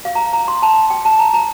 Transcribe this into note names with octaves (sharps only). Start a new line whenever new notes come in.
F5
A#5
A#5
C6
A5
G5
A5
A#5
A#5